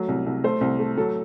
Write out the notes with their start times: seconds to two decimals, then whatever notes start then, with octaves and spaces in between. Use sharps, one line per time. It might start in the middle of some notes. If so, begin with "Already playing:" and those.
Already playing: F#3 A3
0.08 C2
0.26 C2
0.44 A3 C5
0.61 C2
0.79 A3
0.97 F#3 A4